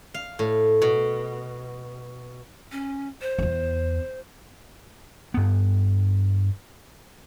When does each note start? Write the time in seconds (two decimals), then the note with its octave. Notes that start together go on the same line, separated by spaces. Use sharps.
0.14 F5
0.39 A2
0.82 B2
2.71 C#4
3.21 C5
3.39 E2 B3
5.34 G2 B3